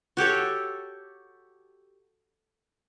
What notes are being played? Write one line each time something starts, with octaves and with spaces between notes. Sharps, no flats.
F#4 G4 A4 C#5